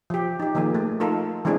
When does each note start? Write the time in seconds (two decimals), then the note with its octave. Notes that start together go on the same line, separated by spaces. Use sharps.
0.10 F3 G4
0.40 D#4 G4
0.55 D#3 F3 A#3 G#4
0.75 A3
1.00 D#4 F4 A4 A#4
1.45 E3 G#3 C4 D4 G#4